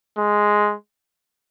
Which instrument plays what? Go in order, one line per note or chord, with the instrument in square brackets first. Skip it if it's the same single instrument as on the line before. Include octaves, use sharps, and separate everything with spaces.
[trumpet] G#3